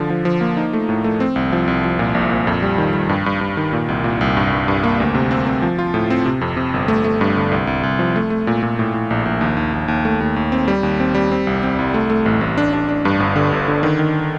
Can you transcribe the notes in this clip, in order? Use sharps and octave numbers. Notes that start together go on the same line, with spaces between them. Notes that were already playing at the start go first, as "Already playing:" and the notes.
Already playing: D3 F3
F3
F3
A#3
D#4
A3
A2
A3
C4
C2
F3
C2
F3
A#2
A#1
A#2
F2
G3
D#3
G3
G2
G2
G2
D#3
A#2
C2
A#2
C2
G2
G2
G2
A#3
D2
C3
C4
C4
F3
F4
A2
C4
C3
F2
C3
G1
A3
A3
G2
D3
C2
C2
C2
F3
A3
A3
A#2
A#2
A2
A2
A#1
A#1
D#2
D#2
D#2
D#2
A3
D#2
D#2
C4
G3
D#2
C4
G3
C4
C2
C4
C2
A3
A3
A1
A1
D4
D4
D4
G2
G1
D3
G1
D3
D#3
D#3